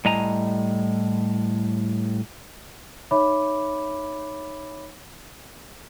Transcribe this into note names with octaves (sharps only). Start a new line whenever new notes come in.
A2 G3 D#5 G#5 A#5
D#4 C#5 E5 B5 D6